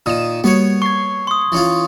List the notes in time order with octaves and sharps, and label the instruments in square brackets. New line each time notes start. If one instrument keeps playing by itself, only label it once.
[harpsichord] A#2 D#3 [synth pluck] D#6 E7
[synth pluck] G3 A#3 F#4 [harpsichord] B3 C#5
[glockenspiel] C#6 [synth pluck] G#6 C7
[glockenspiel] C6 D#6
[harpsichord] E3 C#4 F4